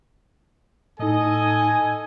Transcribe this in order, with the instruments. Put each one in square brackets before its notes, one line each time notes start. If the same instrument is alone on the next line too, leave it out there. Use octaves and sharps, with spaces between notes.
[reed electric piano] A2 D#4 [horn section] A4 D#5 [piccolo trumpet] G#5